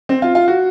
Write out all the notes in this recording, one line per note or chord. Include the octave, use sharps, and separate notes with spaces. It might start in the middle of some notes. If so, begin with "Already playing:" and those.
C4
F4
F4
F#4